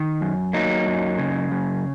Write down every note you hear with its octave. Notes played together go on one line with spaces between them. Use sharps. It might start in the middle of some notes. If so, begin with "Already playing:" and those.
Already playing: D#3
F#2
F#3 A#3 D#4
F#2
C#3
F#2